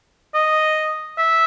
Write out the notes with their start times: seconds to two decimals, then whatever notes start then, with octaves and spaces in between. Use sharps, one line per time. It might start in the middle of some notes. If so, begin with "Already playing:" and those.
0.34 D#5
1.18 E5